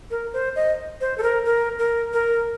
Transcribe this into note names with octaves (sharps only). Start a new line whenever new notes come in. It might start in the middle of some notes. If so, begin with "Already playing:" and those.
A#4
C5
D#5
C5
A4
A#4
A#4
A#4
A#4